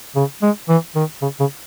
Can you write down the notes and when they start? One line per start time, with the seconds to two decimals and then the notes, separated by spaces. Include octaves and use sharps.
0.15 C#3
0.42 G#3
0.69 E3
0.95 D#3
1.22 C#3
1.40 C#3